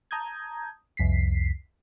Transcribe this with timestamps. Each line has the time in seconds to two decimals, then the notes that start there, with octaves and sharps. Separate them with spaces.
0.11 A5 A#5 D#6 G6 G#6
0.97 C2 F2 B6 C7